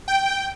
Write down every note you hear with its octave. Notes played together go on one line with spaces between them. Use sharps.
G5